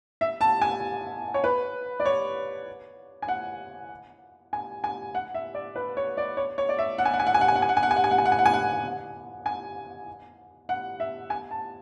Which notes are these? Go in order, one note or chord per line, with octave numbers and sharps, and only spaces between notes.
E5
A5
G#5
C#5
B4
D5
C#5
G#5
F#5
G#5
G#5
F#5
E5
D5
B4
C#5
D5
C#5
C#5
D5
E5
F#5
G#5
F#5
G#5
F#5
G#5
F#5
G#5
F#5
G#5
F#5
G#5
F#5
G#5
F#5
G#5
F#5
G#5
F#5
G#5
F#5
G#5
F#5
G#5
F#5
E5
G#5
A5